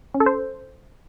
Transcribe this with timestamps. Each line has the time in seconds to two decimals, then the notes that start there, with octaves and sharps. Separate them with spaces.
0.14 C#4
0.20 A4
0.26 C5